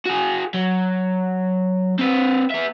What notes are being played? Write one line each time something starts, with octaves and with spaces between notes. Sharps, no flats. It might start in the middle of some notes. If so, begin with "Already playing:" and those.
F#4 G#4
F#3
C4 B4
B3 E5